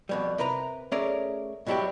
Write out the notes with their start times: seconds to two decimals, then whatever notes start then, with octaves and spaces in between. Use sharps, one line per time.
0.09 F2 B2 G3
0.38 C3 A#4 B4 A#5
0.92 A3 C#4 G#4 A#4 C#5 D5
1.67 G#2 B2 F#3 G3 E4 G4